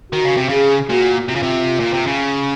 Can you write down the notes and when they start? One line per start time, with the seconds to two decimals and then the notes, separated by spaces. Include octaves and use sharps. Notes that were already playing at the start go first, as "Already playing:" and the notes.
0.12 D#3 F#4
0.24 C#3
0.37 C3
0.49 C#3 G#4
0.90 A#2 F#4
1.29 C3 F4
1.35 C#3
1.43 C3
1.79 A#2
1.93 C3
2.06 C#3